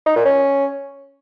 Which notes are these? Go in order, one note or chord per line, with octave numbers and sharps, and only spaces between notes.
D#4
A#2
C#4